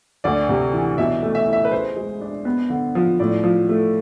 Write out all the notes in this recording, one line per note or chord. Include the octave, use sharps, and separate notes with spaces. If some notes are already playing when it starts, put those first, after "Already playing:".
D2 D5
C3
E3
B2 E5
A3
E5
E4
E5
B4
G#4 C5
G#3
D4
B3
D3
F3
A2 D5
F3
A3